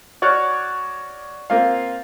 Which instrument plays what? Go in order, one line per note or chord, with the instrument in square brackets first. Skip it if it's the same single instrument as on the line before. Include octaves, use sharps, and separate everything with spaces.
[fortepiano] F#4 C#5 D5 C#6 F6 F#6
A#3 C4 F4 F5